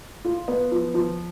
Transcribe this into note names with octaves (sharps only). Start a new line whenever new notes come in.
F4
B3
F3
F3